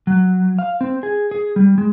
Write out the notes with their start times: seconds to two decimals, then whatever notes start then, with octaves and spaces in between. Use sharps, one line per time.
0.07 F#3
0.59 F5
0.81 C4
1.03 G#4
1.31 G#4
1.56 G3
1.78 G#3